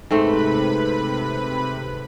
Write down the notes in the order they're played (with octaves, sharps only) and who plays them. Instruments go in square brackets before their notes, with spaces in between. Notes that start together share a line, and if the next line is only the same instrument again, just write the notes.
[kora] G#2 A3 C4 [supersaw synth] C3 B4 B5